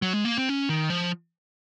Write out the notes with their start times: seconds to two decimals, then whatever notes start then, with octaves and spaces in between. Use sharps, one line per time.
0.02 F#3
0.13 G#3
0.25 A#3
0.37 C4
0.49 C#4
0.69 D#3
0.90 F3